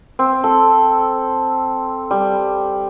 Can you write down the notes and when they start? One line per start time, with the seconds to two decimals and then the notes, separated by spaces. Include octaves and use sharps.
0.19 C4
0.44 A4
2.11 G3